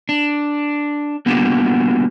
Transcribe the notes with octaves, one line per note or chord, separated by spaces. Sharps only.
D4
G3 A#3 B3 D4 F4 F#4